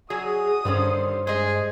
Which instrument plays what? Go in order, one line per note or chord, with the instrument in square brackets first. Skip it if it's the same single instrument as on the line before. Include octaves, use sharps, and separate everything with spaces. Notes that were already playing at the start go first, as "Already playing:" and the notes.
[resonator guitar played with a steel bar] F#3 [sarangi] F#4 [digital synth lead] G#4 [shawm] D#6
[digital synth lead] G2 [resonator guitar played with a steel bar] D3 D#3 C#4 [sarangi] C5
[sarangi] G#3 [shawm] G#4 [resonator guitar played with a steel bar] C5 D#5